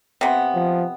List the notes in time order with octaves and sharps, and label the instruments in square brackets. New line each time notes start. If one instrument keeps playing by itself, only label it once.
[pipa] C3 B3
[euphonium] F3